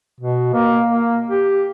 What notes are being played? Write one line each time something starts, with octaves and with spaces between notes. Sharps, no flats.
B2
A#3
A#3
G4